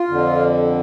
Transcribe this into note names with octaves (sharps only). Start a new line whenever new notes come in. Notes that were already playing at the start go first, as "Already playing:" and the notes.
Already playing: F4
F2 D3